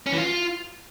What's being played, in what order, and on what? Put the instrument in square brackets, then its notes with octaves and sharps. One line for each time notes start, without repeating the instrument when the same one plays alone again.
[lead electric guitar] C#4
E3
F4